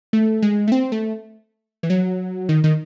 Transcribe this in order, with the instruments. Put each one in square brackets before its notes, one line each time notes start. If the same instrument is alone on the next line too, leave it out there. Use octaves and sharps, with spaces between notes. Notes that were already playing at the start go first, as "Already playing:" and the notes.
[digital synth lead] A3
G#3
A3
C4
A3
E3
F#3
D#3
D#3